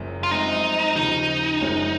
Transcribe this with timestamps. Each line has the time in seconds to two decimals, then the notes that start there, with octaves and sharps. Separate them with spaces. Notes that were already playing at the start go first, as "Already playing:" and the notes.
Already playing: F#1 F#2 F3
0.23 F4
0.31 F#2 F3 G#3 C4 D#4
0.96 D#2 C#3 F3 D#4
1.61 F#1 F#2 F3 G#3 C#4